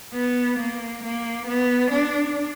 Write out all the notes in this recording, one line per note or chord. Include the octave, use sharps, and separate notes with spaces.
B3
A#3
A#3
B3
D4